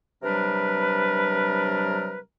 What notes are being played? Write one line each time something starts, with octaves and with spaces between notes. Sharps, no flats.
C3 F#3 G3 D4 A#4 B4